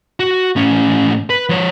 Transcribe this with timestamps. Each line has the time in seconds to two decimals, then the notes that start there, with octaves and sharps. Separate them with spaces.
0.20 F#4
0.56 A2 C#4
1.30 B4
1.49 F3 C#5